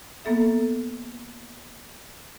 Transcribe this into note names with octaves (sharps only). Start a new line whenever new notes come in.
A#3 B3 A4 E5